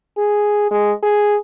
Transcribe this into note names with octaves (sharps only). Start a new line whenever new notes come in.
G#4
G#3
G#4